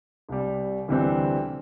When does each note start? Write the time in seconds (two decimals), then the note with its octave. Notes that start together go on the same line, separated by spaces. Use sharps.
0.29 C2 C3 G3
0.88 D2 C3 E3 G3 C4